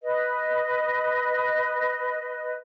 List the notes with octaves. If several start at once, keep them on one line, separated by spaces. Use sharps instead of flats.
B4 D#5